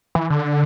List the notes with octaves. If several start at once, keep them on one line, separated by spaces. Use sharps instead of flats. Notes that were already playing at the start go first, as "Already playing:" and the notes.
E3
D3